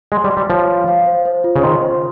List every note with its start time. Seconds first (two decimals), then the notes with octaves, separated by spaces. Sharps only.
0.12 G#3 C6
0.24 G3
0.30 C6
0.37 G3
0.50 F3 C#5
0.68 F5
0.88 F5
1.06 C5
1.26 C5
1.44 F4
1.56 C#3
1.63 D#3 C6
1.82 C5